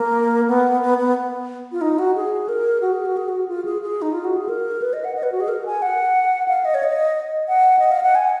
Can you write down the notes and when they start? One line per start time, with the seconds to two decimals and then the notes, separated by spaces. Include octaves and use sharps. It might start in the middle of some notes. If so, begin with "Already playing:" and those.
Already playing: A#3
0.48 B3
0.82 B3
0.98 B3
1.72 F4
1.81 D#4
1.99 F#4
2.15 G#4
2.49 A#4
2.81 F#4
2.93 G#4
3.05 F#4
3.17 G#4
3.28 F#4
3.48 F4
3.65 G#4
3.82 G#4
4.02 D#4
4.13 F4
4.24 F#4
4.37 G#4
4.49 A#4
4.82 B4
4.93 D#5
5.04 F#5
5.15 D#5
5.23 B4
5.32 F#4
5.40 G#4
5.48 A#4
5.66 G#5
5.82 F#5
6.48 F5
6.65 D#5
6.74 C#5
6.83 D#5
7.48 F#5
7.79 D#5
7.91 F5
8.03 F#5
8.15 G#5